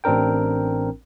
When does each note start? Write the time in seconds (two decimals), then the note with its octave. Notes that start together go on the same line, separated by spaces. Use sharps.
0.04 A1 C4 D4 A#4 G5